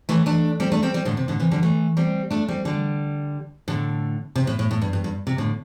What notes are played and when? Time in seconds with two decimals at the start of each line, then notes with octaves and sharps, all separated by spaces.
0.09 E3 A3
0.26 A3 D4
0.60 G3 C4
0.72 A3 D4
0.83 G3 C4
0.94 G3 C4
1.05 A2 D3
1.17 C3
1.28 A2 D3
1.40 C3 E3
1.51 D3 G3
1.63 E3 A3
1.97 G3 C4
2.31 A3 D4
2.48 G3 C4
2.65 D3 G3
3.68 A2 D3
4.36 C3
4.47 A2
4.59 A2
4.71 A2
4.82 G2
4.93 G2
5.04 G2
5.27 C3
5.38 A2 D3